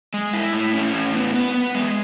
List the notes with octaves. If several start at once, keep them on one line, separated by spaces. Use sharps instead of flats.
G#3
E4
A2
C#4
A2
B3
B3
B3
G#3